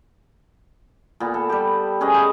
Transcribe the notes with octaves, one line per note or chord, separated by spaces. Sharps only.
A#2 B3
A4
G3 G4
C#4 G#4 B4 D#5
C5